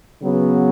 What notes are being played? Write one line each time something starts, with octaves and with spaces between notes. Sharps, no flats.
C#3 F#3 B3